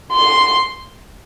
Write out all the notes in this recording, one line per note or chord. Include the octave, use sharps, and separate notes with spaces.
C6